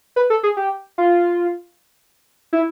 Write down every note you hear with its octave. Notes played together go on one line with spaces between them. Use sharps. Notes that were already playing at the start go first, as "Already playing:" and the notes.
B4
A4
G#4
G4
F4
E4